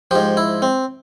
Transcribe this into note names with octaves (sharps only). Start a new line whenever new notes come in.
G#2 F3 G4
E4
C4